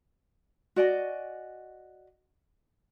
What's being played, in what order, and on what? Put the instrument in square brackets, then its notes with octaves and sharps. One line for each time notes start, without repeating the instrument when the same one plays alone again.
[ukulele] F#4 D5 D#5 G#5